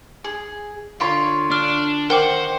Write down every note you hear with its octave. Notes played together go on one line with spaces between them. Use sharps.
G#4
D3 F4 C#5 B5
D4 F6
D#3 A#4 C5 F#5 G5 C#6 D6